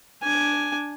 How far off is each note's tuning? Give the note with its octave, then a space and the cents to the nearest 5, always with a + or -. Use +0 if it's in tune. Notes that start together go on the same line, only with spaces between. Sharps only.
D4 +0 G#5 +5